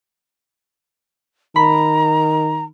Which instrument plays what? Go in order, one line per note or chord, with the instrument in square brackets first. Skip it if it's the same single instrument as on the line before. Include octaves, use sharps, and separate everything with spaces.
[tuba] D#3 [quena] A#5 [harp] B5